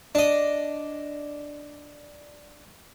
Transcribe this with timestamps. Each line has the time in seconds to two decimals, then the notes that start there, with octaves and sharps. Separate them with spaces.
0.15 D4 D#5